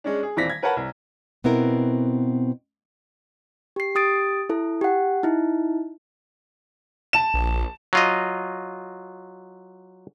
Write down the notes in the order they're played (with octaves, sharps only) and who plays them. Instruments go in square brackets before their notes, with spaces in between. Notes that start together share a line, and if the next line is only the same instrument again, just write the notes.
[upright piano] G#3 C#4 D4
G#4
D#1 E3 C4 D5 A#6 B6
G#6
A#4 B4 C#5 F#5 A5 A#5
C2
[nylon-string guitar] B2 B3 C4 E4 A#4
[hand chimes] G4 C7
G4 D#6 A6 D7
E4 A4
G4 F#5
D#4 E4
[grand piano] A5 E7
[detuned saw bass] A#1
[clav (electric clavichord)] F#3 F4 D#5